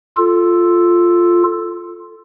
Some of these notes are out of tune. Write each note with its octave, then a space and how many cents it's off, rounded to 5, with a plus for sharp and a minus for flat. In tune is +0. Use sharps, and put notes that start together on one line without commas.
F4 +0 A4 +0